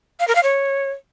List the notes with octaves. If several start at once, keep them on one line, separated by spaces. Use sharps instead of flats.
F5
A#4
F5
C#5